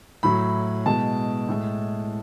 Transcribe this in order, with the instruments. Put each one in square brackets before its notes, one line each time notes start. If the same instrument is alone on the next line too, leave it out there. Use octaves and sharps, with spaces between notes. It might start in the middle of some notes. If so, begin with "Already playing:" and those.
[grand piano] A2 F#3 B5
B2 G#3 A5
A2 G#3